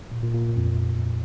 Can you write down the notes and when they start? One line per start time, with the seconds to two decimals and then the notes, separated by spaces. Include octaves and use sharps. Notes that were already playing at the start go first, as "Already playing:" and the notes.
0.12 A#2
0.23 A#2
0.34 A#2
0.57 F2